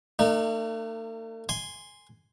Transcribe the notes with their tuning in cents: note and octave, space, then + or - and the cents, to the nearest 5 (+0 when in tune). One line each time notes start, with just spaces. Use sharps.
A3 +45 D#4 -35
G#5 -5 C6 -5